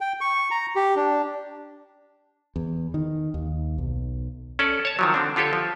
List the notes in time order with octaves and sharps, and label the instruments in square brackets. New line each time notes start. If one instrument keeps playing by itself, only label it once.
[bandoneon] G5
C#6
A#5
G4
D4
[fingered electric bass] E2
D#3
D#2
B1
[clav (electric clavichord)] C#4 A4 D5
C#5 A5
D#3 F3 F#3
D3 C4 D4
D3 F4 G4 A4 C#5
F3